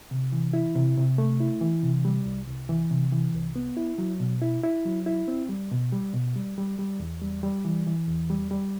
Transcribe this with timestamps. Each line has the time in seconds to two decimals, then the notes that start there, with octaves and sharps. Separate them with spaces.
0.11 C3
0.32 E3
0.53 E4
0.76 C3
0.97 C3
1.18 A3
1.40 E4
1.61 E3
1.83 C3
2.05 G3
2.26 C2
2.48 C2
2.69 E3
2.91 C3
3.12 E3
3.34 C2
3.56 B3
3.77 E4
3.98 F#3
4.20 B2
4.42 E4
4.64 E4
4.85 F#3
5.06 E4
5.28 C4
5.49 G3
5.71 B2
5.92 G3
6.14 B2
6.36 G3
6.58 G3
6.79 G3
7.00 E2
7.21 G3
7.43 G3
7.65 E3
7.87 E3
8.08 E2
8.30 G3
8.51 G3